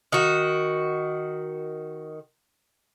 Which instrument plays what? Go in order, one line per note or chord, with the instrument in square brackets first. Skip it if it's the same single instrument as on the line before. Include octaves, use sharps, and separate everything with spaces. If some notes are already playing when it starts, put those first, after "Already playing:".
[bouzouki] D#3 F#4